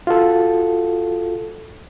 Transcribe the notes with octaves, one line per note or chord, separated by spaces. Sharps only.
F4 F#4 A4